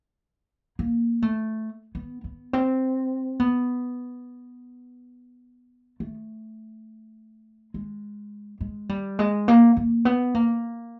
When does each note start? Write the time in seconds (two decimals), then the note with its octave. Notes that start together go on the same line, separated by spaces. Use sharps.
0.79 A#3
1.22 A3
1.95 B3
2.24 B3
2.53 C4
3.40 B3
6.00 A3
7.74 G#3
8.61 G#3
8.89 G3
9.19 G#3
9.48 A#3
9.77 A#3
10.05 B3
10.35 A#3